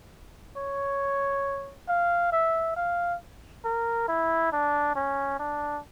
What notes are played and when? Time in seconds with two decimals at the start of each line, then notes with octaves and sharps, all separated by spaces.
0.57 C#5
1.88 F5
2.33 E5
2.77 F5
3.65 A#4
4.08 E4
4.52 D4
4.96 C#4
5.40 D4